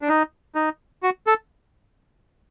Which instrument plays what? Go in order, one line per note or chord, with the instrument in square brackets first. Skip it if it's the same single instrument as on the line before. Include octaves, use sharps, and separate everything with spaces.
[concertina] D4
D#4
D#4
F#4
A4